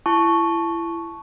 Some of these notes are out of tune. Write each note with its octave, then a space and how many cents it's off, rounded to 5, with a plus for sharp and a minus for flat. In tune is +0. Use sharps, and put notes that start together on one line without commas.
E4 +30 A5 -15 C#6 +0